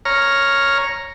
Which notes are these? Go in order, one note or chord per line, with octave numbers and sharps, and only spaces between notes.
C#5 A#5 F6